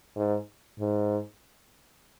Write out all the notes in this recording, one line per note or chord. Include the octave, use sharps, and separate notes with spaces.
G#2
G#2